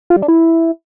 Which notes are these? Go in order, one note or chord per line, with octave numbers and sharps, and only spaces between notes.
F4
G3
D4
E4